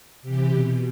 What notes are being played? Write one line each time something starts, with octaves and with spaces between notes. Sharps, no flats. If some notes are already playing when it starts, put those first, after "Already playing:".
C3 E3 G4
B2